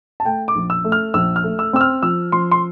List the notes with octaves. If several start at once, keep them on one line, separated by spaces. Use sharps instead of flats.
A5
A3 G5
D6
A#1
E6
A3
F6
A#1 E6
F6
A3
E6
C4 E6
F6
F3 E6
F3 C6
C6